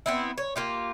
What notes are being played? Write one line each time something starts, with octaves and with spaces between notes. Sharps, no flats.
B3 C4 E4
C#5
A#3 F4 G4